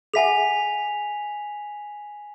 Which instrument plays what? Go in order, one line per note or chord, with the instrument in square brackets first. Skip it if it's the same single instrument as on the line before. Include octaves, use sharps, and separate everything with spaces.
[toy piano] G#4 E5 F#5 [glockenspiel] G#5 B6 F7